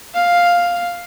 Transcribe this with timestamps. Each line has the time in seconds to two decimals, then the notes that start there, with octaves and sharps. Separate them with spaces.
0.14 F5